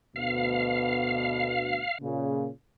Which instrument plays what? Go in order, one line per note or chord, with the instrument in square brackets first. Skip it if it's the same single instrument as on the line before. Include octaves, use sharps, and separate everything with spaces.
[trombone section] D2 B2 [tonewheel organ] F5
[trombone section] A#2 C#3